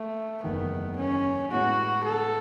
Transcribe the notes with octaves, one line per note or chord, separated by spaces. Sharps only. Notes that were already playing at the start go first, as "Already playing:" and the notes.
Already playing: A3
F#1 E2 D#3 A3 B3
C#4
A2 G#3 B3 E4 F#4
A4